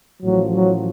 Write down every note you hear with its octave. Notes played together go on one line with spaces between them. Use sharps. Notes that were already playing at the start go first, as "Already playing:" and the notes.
A1 A2 F3 F#3
F#3